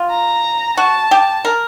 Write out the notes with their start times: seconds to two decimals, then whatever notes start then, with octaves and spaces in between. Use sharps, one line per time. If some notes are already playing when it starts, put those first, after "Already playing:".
Already playing: F4
0.11 A#5
0.77 F#4 A5
1.11 G4
1.45 A#4